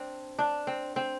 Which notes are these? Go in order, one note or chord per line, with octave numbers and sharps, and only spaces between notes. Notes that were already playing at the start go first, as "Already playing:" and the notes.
Already playing: C4 D4
D4
C4
C4